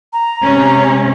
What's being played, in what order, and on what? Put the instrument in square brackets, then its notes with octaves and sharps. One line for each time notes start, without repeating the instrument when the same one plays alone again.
[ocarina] A#5
[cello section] C3 G#3 C#4